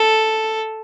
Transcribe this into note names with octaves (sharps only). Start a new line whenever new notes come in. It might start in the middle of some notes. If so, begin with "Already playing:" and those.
Already playing: A4